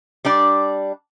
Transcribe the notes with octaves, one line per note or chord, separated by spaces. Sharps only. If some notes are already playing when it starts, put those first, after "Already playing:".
G3 D4 D5